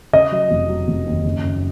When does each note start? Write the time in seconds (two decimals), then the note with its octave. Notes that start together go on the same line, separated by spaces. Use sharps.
0.13 C#3 D#5
0.32 F#3
0.51 F1
0.69 F#3
0.88 F1
1.06 D#2
1.25 F#1
1.44 F#2